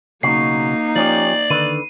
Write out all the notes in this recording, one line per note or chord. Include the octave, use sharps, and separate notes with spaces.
B1 C#3 A#3 D#4 F#4 C7
F3 C#4 G4 D5
D3 D#3 B4 D#7